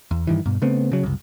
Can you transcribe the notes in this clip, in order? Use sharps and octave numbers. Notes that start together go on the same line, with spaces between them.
E2
G2 D#3 E3
G2 B2
C#3 A3 B3 C4
C#3 F#3
F#1 C2